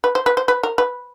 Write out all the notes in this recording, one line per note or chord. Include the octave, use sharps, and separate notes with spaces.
B4
C5
B4
C5
B4
A#4
B4